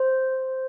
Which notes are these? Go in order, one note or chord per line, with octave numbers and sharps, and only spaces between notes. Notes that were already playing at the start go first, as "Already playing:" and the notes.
Already playing: C5